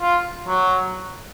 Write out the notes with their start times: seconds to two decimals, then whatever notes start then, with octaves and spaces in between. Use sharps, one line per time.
0.01 F4
0.47 F#3